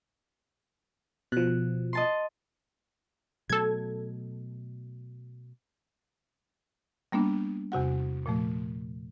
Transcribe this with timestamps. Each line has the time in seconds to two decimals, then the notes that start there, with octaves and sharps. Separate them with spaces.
1.32 B2 F3 F#6
1.93 D#5 A5 C6
3.50 B2 F#3 A3 A4 G#6
7.12 G3 A#3 B3 D4
7.72 E2 C3 F#4 F#5
8.26 A#2 F3 A3